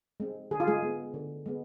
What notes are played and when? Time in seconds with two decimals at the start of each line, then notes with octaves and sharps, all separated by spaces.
0.20 G#3 C4
0.51 D3 G#4
0.60 F4
0.67 G#3 G#4
0.83 G#3 B3
1.14 D3
1.46 G#3 B3